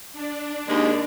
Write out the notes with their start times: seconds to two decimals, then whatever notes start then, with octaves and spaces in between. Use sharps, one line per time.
0.13 D4
0.68 D#2 G#3